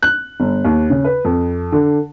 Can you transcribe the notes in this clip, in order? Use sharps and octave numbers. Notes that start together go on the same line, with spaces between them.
F#6
G1
D#2
C#3
B4
F2
D3